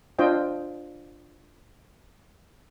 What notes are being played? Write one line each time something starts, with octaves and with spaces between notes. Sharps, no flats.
D4 F4 C5 D#5 G5